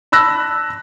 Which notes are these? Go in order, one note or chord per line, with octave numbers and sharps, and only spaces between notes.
A5 B5 E6 F#6 A#6